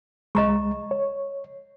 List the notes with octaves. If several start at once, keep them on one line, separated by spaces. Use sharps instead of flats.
C2 G#3 D#5 A#5 C#6
C#5